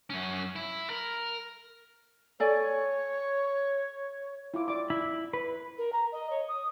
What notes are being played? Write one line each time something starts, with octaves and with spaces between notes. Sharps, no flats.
F#2 C#4
E4
A#4
A4 C#5 D5 G#5
E4 F4 D6
D5 E5 D6
E4
B4 B5
A#4
A#5
D#5
C#5
D#6